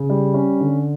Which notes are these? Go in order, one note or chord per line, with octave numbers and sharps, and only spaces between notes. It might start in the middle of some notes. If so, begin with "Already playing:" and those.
Already playing: C#3
G3
C#4
D3